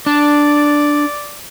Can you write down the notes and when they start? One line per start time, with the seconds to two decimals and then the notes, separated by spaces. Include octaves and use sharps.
0.06 D4 D5